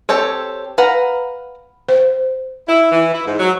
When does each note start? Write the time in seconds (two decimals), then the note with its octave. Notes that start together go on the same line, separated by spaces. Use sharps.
0.09 C4 G4 A4 C#5
0.78 B4 F5 F#5 A#5
1.89 C5
2.67 E4
2.92 E3
3.14 E4
3.26 G#2
3.39 F#3